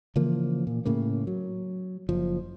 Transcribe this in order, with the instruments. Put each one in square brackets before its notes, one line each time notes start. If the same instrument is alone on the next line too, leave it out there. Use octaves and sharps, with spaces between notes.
[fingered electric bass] C#3 E3 F3 A#3
A#2
A2 C#3 A#3
F#3
F#1 F3